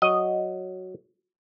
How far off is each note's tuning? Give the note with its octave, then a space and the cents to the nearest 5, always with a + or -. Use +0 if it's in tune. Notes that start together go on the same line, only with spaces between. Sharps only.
F#3 +0 D#5 +0